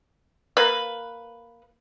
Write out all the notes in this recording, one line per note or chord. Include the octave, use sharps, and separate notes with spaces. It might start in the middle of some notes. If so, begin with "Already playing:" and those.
A#3 B4